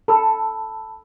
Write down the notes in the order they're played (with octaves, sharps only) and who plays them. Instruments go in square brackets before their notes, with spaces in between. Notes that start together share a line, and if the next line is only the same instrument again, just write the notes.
[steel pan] A4 [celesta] A5 B5 E6